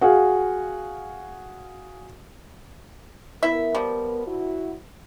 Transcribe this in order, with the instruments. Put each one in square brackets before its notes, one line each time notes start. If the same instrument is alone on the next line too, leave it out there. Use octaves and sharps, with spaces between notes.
[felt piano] F#4 G#4 F5
[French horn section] B3 A#4 [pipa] E4 E5
[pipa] F3 G3
[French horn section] E4 F#4